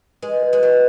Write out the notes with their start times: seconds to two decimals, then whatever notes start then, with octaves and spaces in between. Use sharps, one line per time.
0.22 G#3 B4
0.43 B4
0.53 G#3
0.63 F#3 B4